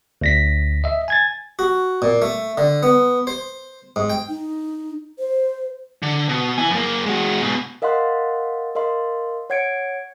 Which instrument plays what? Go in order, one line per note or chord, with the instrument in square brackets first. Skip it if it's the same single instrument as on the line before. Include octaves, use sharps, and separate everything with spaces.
[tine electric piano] D2 A#6 B6
D#5 E5
G#5 G#6 A6
[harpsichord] F#4
A#2
A3
D3
B3
C5
G#2
G5
[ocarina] D#4
C5
[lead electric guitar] D3
B2
E4 G#5
F#2 A#3
G#3 F#4
G#2 B2
[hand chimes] A#4 D#5 F5 F#5 C6 F#6
A#4 D#5 F5 C6
C#5 F#5 G#6 C#7 D7